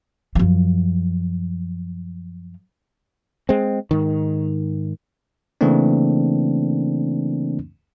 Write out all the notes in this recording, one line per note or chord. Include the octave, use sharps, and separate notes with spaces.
F#2 F3
G#3 C4
G#2 D#3
C#3 E3 A3 A#3 C4 D4